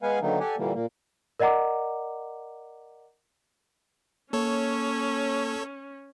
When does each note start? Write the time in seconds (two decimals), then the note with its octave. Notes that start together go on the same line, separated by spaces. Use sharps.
0.03 G#3 B3 B4 F5 F#5 G#5
0.21 D3 D#3 F#3 A#3 B3 D#4
0.40 G4 A4 D5 F#5 G#5
0.58 A#2 D3 E3 G3 A#3
0.74 A#2 A#3
1.40 A#4 D5 D#5 F#5 A#5 D6
4.33 A#3 C#4 A4 C#5